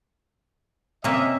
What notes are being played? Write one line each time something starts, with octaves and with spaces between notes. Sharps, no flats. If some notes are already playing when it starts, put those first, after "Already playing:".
C3 A#3 C#4 D#5 E5